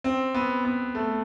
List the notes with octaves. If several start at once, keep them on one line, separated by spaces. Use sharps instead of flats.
C4
B3
B3
A3